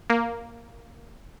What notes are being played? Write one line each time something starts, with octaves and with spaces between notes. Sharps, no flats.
A#3